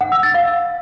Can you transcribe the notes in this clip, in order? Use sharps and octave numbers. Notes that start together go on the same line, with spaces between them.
F#5
E6
A6
F5